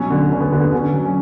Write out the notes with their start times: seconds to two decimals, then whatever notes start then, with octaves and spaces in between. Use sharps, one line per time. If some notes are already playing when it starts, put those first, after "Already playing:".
Already playing: B2 F#3 C#4
0.10 D3
0.30 D3 C#4
0.40 B3
0.52 D3
0.60 B3
0.72 D3 C#4
0.93 F#3
1.05 C#4